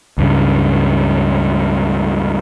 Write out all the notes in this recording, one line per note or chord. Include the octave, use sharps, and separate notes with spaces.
C#2 G2 C#3